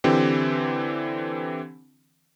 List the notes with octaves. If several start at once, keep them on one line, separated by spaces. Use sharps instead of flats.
D3 E3 C4 G4